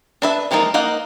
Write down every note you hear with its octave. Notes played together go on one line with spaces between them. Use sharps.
D4 B4 E5
E3 F3 G#3 A#3 D#4
A#3 D#4 D#5 F#5